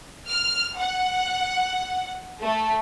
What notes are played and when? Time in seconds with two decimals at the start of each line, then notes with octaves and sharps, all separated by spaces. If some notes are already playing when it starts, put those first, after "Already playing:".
0.28 F6
0.77 F#5
2.41 A3